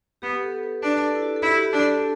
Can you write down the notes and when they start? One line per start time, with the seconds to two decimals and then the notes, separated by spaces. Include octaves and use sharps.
0.22 B3 G4
0.43 A4
0.63 B4
0.82 D4 B4
1.03 A4
1.15 E4
1.22 F#4
1.36 A4
1.42 E4 G4
1.55 F#4
1.62 G4
1.73 D4
1.83 A4